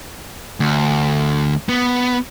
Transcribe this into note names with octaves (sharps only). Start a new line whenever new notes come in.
D2
B3